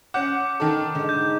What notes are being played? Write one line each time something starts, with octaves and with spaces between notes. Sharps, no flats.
C#4 F#5 D6 G6
D#3 A4
G#2 D3 D#3
G6